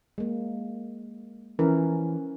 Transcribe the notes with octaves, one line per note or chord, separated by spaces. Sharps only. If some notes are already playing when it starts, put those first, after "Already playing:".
G#3 A#3
E3 F3 C#4 A#4